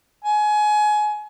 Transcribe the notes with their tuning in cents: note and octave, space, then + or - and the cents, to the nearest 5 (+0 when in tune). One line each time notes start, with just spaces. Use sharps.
G#5 +25